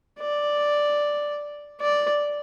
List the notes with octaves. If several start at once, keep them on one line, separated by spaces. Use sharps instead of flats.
D5
D5